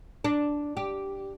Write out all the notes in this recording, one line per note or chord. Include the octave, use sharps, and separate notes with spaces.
D4
G4